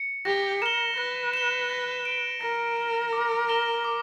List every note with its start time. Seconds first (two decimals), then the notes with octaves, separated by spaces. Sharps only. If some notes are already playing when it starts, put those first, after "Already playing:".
Already playing: C#7
0.25 G4 A#6
0.62 A#4 E7 G7
0.98 B4 A#6
1.34 E7 G7
1.70 A#6
2.05 D7 G7
2.41 A#4 A#6
2.76 D7 G7
3.13 D6
3.49 A#6 E7 G7
3.84 D6